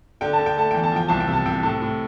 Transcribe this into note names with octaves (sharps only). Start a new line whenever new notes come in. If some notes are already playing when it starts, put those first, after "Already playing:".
D3 G5
A5
D3
G5
A3 A5
E2 G5
A5
F3 G5
C2 A5
G5
C3
A5
C3 G5
A2 A5
A2